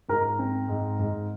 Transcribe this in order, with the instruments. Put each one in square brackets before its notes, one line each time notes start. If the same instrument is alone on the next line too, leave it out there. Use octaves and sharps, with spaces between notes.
[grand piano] G#2 [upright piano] A#4
[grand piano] C4
G#2
G#2